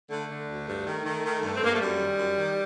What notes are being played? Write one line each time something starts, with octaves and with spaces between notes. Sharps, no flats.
D3 A3
D3
D2
G2
D#3
D#3
D#3
G2
C4
G2 A#3
A3
F#2 G3
D#3
F#2
D#3